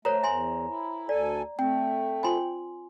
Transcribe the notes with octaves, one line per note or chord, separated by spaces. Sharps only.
A3 A#4 C5 C#5 A#5
E2 E5 G#5 C6
E4
D2 A4 D5 G#5
A3 C4 G5
F4 C5 G#5 B5 C6